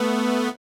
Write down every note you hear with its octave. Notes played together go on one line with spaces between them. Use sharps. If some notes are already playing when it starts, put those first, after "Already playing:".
Already playing: A3 B3